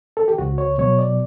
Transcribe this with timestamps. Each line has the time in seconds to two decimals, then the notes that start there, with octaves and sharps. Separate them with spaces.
0.17 A4
0.28 G4
0.38 C#2 F#4
0.58 C#5
0.78 B2 F#3 C#5
0.99 D5